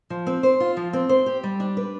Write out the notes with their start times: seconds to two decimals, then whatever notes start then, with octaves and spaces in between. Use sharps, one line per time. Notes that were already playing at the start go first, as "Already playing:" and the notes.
0.10 F3
0.27 C4
0.43 C5
0.60 F4
0.77 F3
0.93 C4
1.09 C5
1.26 G4
1.44 G3
1.60 D4
1.77 B4